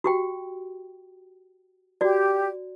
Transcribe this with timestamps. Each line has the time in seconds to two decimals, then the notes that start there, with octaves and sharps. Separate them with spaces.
0.04 F#4 G4 G5
2.01 F#4 G4 D5